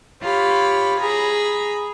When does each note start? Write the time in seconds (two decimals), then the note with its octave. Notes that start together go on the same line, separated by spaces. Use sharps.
0.22 F4 G4 C#5 B5
1.00 G#4 A#5 B5